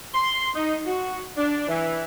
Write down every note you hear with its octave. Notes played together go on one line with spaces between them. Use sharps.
C6
D#4
F#4
D4
E3